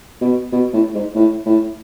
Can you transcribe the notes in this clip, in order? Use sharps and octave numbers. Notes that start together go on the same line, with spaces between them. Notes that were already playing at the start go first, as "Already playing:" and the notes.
B2
B2
A2
G#2
A2
A2